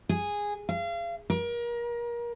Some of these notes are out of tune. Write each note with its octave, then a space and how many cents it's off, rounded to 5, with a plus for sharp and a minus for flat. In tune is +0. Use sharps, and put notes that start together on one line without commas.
G#4 -10
F5 -35
A#4 +30